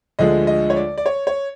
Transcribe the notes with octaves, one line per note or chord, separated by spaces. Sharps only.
D2 D3 F3 G#3 D#5
D#5
C#5
D5
D5
C#5
C#5